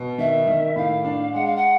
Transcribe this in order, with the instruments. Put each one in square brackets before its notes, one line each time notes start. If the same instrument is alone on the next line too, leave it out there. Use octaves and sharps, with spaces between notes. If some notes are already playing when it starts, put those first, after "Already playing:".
Already playing: [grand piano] B2
[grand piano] D#3 [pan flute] E5
[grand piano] D#3
[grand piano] A2 [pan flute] F5
[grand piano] D4
[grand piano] G#3 [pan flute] F#5
[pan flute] F5
F#5